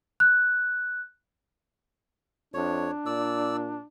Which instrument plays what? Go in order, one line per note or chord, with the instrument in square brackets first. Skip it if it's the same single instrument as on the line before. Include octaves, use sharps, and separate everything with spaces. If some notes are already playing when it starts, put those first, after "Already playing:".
[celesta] F#6
[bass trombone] F2 [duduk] D4 [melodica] C#5
[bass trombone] A#2 [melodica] D5 E6